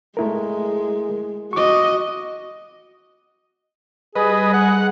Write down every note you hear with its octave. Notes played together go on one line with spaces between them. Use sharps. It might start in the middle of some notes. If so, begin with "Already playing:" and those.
G#3 A3 E4 A#4
F#4 D#5 C#6 D6
G3 G#4 B4 D#5
F#5